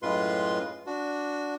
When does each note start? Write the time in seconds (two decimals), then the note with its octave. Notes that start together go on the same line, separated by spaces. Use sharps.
0.02 F#2 A2 G#3 F4 B4 C6
0.86 D4 F#4